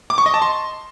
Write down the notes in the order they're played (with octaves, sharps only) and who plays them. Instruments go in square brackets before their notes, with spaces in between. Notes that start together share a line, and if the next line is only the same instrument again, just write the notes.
[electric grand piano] D6
C#6
D#5
A5
C6